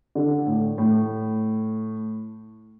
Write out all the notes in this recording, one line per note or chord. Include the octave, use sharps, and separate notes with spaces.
D3
A2
A2